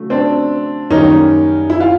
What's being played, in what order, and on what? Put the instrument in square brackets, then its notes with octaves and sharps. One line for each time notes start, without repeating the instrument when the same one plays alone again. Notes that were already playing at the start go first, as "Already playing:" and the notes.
Already playing: [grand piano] C#3 F#3 A3
[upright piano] C4 D4
[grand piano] F#2 D#3 G3 A#3 [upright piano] C#4 D#4
[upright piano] E4
F4